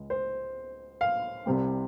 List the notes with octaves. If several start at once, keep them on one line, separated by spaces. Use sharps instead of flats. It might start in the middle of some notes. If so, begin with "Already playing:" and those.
Already playing: C#2 C#3 G#3
C5
F5
C2 C3 G3 C4